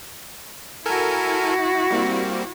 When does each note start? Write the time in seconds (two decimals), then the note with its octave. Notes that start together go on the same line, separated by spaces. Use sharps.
0.86 E4 F#4 A4 A#4 G#5
1.90 G3 A#3 C4